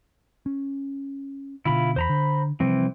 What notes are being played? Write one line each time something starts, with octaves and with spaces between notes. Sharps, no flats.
C#4
B2 D3 E4 F4 B5
E2 C5 A#5 B5
D3
C3 E3 F3 G3 C4